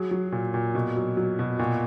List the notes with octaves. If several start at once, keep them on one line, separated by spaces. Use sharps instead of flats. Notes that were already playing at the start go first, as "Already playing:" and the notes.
Already playing: F#3 G#4
F#3
A#2
A#2
B2
F#3
F#3
B2
A#2 F#4